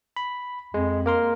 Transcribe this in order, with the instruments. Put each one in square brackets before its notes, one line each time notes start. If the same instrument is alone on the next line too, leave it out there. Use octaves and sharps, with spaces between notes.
[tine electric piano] B5
[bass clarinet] F2 [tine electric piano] G#3
[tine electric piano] A#3 A#4 C6